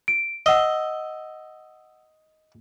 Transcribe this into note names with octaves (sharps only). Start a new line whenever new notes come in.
D7
D#5 F#5 E6 G7